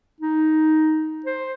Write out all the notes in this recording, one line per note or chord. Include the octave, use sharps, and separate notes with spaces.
D#4
C5